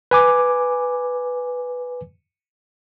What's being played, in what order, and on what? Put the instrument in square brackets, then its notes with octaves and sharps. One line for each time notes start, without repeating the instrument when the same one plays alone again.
[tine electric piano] B4 G#5 D6